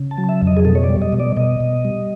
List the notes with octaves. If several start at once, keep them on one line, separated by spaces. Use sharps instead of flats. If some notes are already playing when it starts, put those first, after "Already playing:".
Already playing: C#3
A5
F#3
E5
F2
D#5
G#4
B2 A4
C#5
D5
G3
D#5
B2
D5
B2 D#5
B2
G3